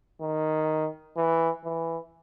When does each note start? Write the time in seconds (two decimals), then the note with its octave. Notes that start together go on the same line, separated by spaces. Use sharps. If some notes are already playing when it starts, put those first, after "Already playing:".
0.22 D#3
1.17 E3
1.65 E3